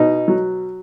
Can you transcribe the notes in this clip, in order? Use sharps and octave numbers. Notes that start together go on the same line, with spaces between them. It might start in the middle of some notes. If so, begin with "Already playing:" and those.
Already playing: B2 D#4
F#3